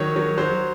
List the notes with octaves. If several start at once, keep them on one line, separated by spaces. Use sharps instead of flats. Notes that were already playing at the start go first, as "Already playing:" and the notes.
Already playing: D#3 F#3 C#5
F#3
F#3 C5